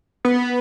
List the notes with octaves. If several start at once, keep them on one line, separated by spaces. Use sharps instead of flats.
B3